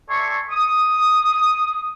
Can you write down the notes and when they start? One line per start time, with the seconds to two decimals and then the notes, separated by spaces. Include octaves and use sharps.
0.09 A4 D5 E5 G#5 C6 C#6
0.50 D#6